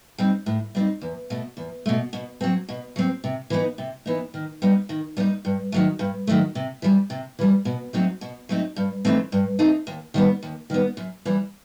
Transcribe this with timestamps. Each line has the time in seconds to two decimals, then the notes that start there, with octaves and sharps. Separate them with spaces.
0.18 G3 C4 D#4
0.46 A2
0.75 G3 C4 D#4
1.01 E2
1.30 B2 A3
1.57 E2
1.86 B2 A3
2.13 B2
2.41 F#3 C4
2.69 B2
2.96 F#3 C4
3.24 C3
3.50 E3 B3 D#4
3.78 C3
4.06 E3 B3 D#4
4.34 D#3
4.62 G3 B3 D#4
4.89 D#3
5.17 G3 B3
5.20 D#4
5.45 G2
5.72 D#3 F#3 A3
5.99 G2
6.27 D#3 F#3 A3
6.55 C3
6.82 E3 G3
7.10 C3
7.39 E3 G3
7.65 B2
7.93 F#3 A3 C4 D#4
8.21 B2
8.49 F#3 A3 C4 D#4
8.76 G2
9.05 E3 A3 C4 D#4
9.32 G2
9.59 E3 A3 C4 D#4
9.87 D#2
10.14 D#3 G3 B3
10.42 D#2
10.70 D#3 G3 B3
10.97 F#2
11.25 E3 G3